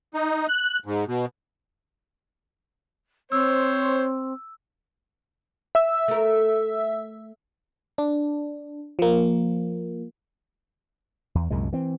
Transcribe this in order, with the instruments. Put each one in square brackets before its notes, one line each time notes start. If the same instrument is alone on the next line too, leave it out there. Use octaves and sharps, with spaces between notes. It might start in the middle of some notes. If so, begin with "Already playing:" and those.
[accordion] D#4
F#6
G#2
B2
[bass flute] C4 [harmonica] C5 C#5 [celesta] E6
[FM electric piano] E5 E6
[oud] A3 A#4
[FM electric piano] D4
F3 A#3
[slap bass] E2
C2 F#2 A#2 G#3
E3 C4